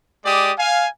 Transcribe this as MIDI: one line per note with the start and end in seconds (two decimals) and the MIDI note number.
0.24 0.52 56
0.24 0.52 67
0.24 0.52 74
0.24 0.52 87
0.58 0.88 77
0.58 0.88 80